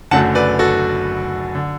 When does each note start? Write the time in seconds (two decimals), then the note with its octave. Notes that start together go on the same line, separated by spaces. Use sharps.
0.11 F#1 F#2 D3 F#3 A3 F#5 A5
0.35 B4 D5
0.59 F#4 A4
1.55 D3